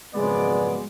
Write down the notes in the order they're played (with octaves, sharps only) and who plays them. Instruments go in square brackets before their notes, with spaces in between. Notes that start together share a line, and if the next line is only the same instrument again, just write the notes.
[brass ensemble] G#1 F2 D5 [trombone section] C#3 F#3 B3 [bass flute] G#3